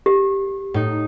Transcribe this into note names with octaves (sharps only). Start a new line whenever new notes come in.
G4
A2 D#4